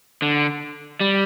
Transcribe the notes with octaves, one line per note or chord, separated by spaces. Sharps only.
D3
G3